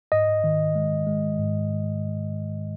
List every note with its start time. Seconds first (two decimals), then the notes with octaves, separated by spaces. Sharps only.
0.12 G#2 D#5
0.44 D#3
0.75 G#3
1.07 G#3
1.38 G#2